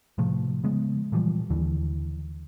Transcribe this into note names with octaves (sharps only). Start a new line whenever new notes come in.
A2 C3 F3 A3
C#3 F3 G#3 B3
A#2 E3 F3 G3
D#2 D3 E3